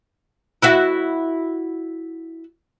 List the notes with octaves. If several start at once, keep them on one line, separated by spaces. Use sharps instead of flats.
E4 F#4 E5